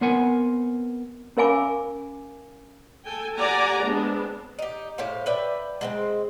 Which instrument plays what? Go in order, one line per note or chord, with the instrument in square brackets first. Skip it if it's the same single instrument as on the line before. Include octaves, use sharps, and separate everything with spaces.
[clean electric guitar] B3 C4 A#4 C5 F#5 G#5
[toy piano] C#4 A#4 F5 G#5 D6
[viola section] A4 G5 G#5
G4 D5 F#5 G#5 A#5
G#3 B3 C4 D4
[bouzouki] D#4 G4
A2 G4 C5 F5
B4 D5 E5 G5
G#3 A#3 C4